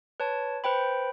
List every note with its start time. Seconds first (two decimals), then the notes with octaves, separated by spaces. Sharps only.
0.20 B4 C#5 A5
0.64 B4 C5 G5 B5